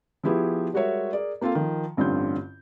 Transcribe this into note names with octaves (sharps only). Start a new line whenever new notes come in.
F3 B3 E4 G4 G#4
G3 G#3 F#4 A#4 C#5 E5
G#4 A#4 D5
A#3 C4 F4 A4 F5
D#3 F3
A1 G2 D3 C4 F4 G6